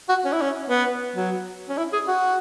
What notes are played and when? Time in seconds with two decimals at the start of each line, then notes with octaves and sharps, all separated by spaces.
0.09 F#4
0.25 C#4
0.33 E4
0.41 C#4
0.70 B3
1.16 F#3
1.69 C#4
1.78 E4
1.93 G#4
2.08 F#4